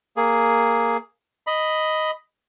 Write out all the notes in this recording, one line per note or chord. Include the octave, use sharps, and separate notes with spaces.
A#3 G#4
D#5 B5